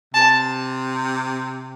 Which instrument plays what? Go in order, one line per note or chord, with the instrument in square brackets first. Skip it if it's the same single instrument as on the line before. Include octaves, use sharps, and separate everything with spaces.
[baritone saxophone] C3 [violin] A5